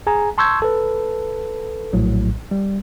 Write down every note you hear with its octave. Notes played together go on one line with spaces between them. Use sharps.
G#4 G#5 A#5
A5 C6 C#6 E6 G6 G#6
A4 B4
A#1 A2 F#3
G3